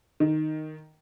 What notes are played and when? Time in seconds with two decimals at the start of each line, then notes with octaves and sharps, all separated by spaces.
0.20 D#3